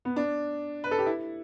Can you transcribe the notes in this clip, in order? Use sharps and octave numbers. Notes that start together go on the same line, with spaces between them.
B3
D4
B4
A4
G4
E4